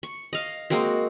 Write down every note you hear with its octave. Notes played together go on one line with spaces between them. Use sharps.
C#6
D#5 F5
G#3 A#3 C4 F#4